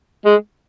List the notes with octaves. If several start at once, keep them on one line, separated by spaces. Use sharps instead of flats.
G#3